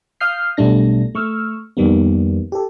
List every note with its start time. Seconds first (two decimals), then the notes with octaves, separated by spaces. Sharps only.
0.20 F5 D#6 F6 G6 C7
0.57 B1 B2 G3 A3 D4 A#6
1.15 A3 C#6 E6 F6
1.77 F2 D#3 G3 A#3 B3
2.52 G4 A4